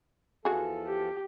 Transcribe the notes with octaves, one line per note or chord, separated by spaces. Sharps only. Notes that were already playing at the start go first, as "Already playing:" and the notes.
E2 F3 F#4 G#4 A4
G4